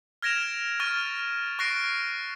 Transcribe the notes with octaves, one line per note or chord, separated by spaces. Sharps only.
F6 G#6 A#6 D7 E7 F7
C#6 F6 A6 D#7
C#6 F#6 A#6 C7 D7